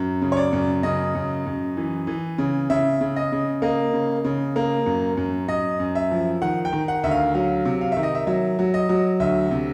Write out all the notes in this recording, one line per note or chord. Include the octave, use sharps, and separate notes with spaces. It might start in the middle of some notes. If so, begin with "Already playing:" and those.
Already playing: F#2
C#3
C#5
D5
F#2
C#3 D#5
F#2
F#2
E3
E3
C#3
C#3 E5
C#3
D#5
C#3
A#3 D#5
C#3
C#3
A#3
F#2
F#2
F#2 D#5
F#2
E5
F3
D#3 F#5
G5
D#3
F#5
D2 E5
F5
F#3 F5
C3
F5
D#3 E5
D#5
E5
F#3 E5
F#3
D#5
F#3
D2 E5
C3